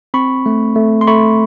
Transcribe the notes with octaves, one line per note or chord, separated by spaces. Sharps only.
C4 B5 C#6
A3
A3
C6
A3 B5 C#6